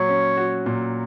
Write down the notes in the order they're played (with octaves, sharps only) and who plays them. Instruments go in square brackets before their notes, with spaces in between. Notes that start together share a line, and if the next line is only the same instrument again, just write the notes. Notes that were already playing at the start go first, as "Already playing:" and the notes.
Already playing: [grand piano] A#2 F#3 [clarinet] C#5
[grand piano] C#4
F#4
A#2